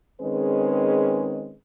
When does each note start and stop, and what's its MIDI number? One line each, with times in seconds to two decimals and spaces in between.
0.21 1.53 51
0.21 1.53 56
0.21 1.53 60
0.21 1.53 61
0.21 1.53 68
0.21 1.53 71